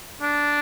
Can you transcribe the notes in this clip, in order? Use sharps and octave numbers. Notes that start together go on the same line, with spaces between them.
D4